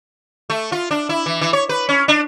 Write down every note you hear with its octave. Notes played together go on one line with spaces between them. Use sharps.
A3
F4
D4
E4
E3
E3
C#5
B4
C#4
D4